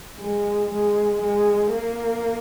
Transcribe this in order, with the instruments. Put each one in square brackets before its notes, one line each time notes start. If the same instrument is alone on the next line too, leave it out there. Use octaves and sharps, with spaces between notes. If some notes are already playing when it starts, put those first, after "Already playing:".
[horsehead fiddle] G#3
G#3
G#3
A#3